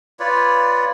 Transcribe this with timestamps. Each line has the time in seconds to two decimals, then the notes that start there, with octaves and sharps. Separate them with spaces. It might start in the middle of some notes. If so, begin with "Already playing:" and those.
0.20 F4 B4 C#5 D5